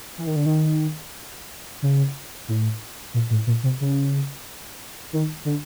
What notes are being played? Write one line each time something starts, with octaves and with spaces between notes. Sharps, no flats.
E3
D#3
D3
D#3
C#3
A2
A#2
A2
A#2
C3
C#3
D#3
D3